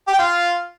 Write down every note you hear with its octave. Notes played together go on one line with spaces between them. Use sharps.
G4
G5
F4